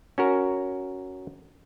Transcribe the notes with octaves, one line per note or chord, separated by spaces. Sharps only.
C#4 F#4 A#4